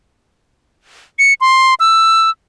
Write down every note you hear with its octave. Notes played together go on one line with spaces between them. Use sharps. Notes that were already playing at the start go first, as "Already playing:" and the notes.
C#7
C6
E6